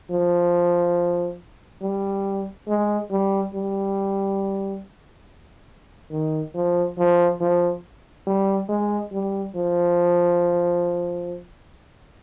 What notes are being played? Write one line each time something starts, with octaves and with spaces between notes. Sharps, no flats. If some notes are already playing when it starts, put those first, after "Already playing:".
F3
G3
G#3
G3
G3
D#3
F3
F3
F3
G3
G#3
G3
F3